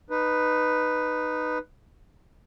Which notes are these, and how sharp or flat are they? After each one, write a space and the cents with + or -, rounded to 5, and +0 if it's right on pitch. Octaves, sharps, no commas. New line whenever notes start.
D#4 -15 B4 +0